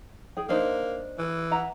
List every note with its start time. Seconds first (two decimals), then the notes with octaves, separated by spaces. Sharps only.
0.37 G#4 G5
0.49 A#3 D4 D#4 C5
1.19 E3
1.51 E5 F#5 A#5